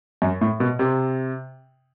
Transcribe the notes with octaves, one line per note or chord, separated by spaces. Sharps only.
F#2
A2
B2
C3